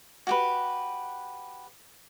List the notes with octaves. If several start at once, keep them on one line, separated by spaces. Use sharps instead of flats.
F#4 G4 B4